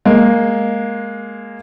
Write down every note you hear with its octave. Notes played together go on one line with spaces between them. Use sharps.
G#3 A#3